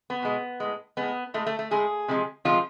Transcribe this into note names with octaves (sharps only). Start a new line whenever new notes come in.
B3
B2 G#3
A2 G#3
A2 G#3 B3
A2 G#3 A3
A3
A3
A2 G#3 G#4
C3 F3 G#3
C3 F3 G#3 F4